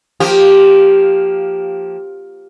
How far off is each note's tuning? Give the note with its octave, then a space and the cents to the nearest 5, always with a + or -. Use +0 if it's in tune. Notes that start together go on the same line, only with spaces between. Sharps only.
F3 +10 A#3 +0 G4 +0